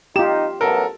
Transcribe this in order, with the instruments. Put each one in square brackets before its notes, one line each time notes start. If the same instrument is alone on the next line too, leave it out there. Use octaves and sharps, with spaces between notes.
[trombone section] D#4 [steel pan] F4 G4 [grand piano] E7
[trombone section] A1 F#3 B3 [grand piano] A4 A#4